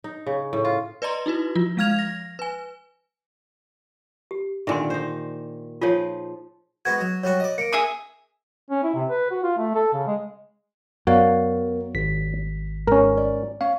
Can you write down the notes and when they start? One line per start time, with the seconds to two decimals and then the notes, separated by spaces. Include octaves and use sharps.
0.04 D#4
0.26 C#3
0.53 A2
0.65 F4
1.02 B4 D5 D#5 A#5 C6
1.26 D#4 E4 F#4 B4
1.56 F3 F4
1.77 F3 G#3 F5 F6 G#6 F7
1.99 A#6
2.39 B4 G#5
4.31 G4
4.67 A#2 D3 D#3 E5 G#5 C6
4.90 D#4 C5
5.81 F3 D#4 F4 G#4 C#5
6.85 G#3 B3 F#4 G#6
7.00 F#3
7.24 F#3 G3 F#4 C#5
7.40 D5 D#5
7.58 A#3 C#7 D7
7.73 G#4 E5 D#6
8.70 C#4
8.83 E4
8.95 C3
9.10 B4
9.31 F#4
9.43 F4
9.57 A3
9.75 A4
9.93 C#3
10.07 G#3
11.07 F#2 B3 F#4 A#4 C#5 D5 F5
11.95 G#1 B6
12.87 G#2 C#4 A#4
13.17 D5
13.61 C#4 F5